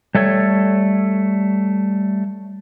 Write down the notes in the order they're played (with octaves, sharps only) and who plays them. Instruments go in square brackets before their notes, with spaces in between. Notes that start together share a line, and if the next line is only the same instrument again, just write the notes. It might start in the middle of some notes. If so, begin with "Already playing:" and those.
[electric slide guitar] G3 A3 A4 C#5